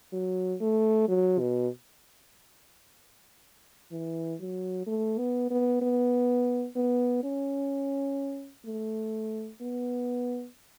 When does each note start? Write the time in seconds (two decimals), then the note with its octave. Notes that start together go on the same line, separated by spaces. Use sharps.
0.13 F#3
0.61 A3
1.09 F#3
1.40 B2
3.92 E3
4.40 F#3
4.87 A3
5.18 B3
5.51 B3
5.82 B3
6.76 B3
7.24 C#4
8.66 A3
9.62 B3